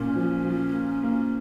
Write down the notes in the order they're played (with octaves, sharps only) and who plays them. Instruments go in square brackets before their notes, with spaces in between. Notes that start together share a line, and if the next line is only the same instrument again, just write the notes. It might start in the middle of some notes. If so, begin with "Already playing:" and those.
Already playing: [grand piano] A#2 [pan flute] C#4
[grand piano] F3
F3
A#3
A#3